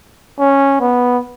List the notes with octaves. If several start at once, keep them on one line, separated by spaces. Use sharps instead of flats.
C#4
B3